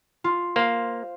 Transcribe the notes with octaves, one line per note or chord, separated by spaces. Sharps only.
F4
A#3 C5 F5